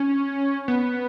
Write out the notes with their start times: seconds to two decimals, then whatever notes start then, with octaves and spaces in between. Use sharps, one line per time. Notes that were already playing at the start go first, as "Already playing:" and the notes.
Already playing: C#4
0.68 B3